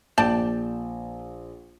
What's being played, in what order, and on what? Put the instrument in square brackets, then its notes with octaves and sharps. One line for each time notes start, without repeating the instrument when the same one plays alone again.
[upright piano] A#1 [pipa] D5 G5 A5